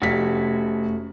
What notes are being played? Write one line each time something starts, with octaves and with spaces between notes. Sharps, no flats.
F1 A3 C#4 F#4 B6